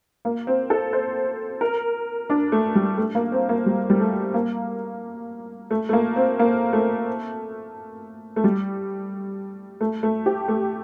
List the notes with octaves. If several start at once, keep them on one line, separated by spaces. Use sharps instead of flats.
A#3
C4
A4
C5
A#4
D4
A3
G3
A3
A#3
C4
A#3
G3
G3
A3
A#3
A3
A3
A#3
C4
A#3
A3
A3
G3
A3
A3
G4
A3